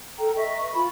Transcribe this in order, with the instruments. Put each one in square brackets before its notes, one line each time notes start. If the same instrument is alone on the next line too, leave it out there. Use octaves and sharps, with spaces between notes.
[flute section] A4 A#4 G5 A#5
D#5 E5 C#6
B4 C#6
F4 B5